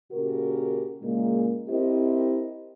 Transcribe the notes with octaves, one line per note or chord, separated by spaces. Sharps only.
A#2 C#3 F#4 G4 A#4
A#2 C#3 G#3 A#3
C4 E4 G4 A#4 C5 D#5